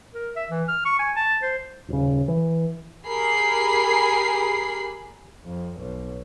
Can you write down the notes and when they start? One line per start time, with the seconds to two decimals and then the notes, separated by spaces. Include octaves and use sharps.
0.14 A#4
0.36 E5
0.50 E3
0.68 F6
0.85 C#6
0.99 G#5
1.16 A5
1.42 C5
1.88 D#1 C#3
2.28 E3
3.07 G4 G#4 A#4 B5 C7
5.45 F2
5.80 B1